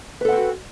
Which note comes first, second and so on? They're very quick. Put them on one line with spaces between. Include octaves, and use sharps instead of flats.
B4 A4 F#5 C4 F#4